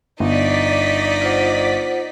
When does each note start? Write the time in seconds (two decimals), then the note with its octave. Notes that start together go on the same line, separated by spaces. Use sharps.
0.20 G1 D#4 D5 D#5 B6
1.21 F4 C5 F#5